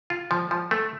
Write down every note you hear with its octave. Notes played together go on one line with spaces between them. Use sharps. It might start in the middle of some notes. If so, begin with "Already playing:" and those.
F4
F3
F3
A3